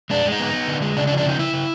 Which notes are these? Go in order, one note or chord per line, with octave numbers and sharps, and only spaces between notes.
G#3 D4
G#3
D#4
B3
B3
D3
G#3
C#3 D4
D4
F3
D4
C#3 D#4
C#3 E4
C#3